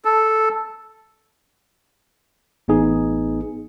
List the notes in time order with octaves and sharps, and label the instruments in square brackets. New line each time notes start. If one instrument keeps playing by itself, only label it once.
[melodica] A4
[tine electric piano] A1 B3 D#4 G#4